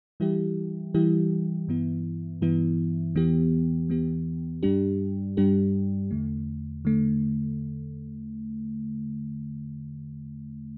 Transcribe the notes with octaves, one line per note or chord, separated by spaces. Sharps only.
E3 G3 E4 G4
E3 G3 E4 G4
G2 E3 B3 E4
G2 E3 B3 E4
E2 E3 B3 G4
E2 E3 B3 G4
G2 G3 D4 G4
G2 G3 D4 G4
E2 D3 A3
D3 A3